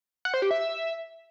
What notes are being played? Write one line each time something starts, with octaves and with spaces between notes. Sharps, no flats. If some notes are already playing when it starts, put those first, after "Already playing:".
F#5
C5
G4
E5